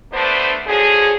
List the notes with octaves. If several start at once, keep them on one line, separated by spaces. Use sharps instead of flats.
D2 D3 A3 B3 D4 C5
D3 F3 F#3 G#4